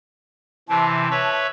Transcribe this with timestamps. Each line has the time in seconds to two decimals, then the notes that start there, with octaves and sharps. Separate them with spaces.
0.69 C3 E3 C4 A5
1.10 B4 C#5 E5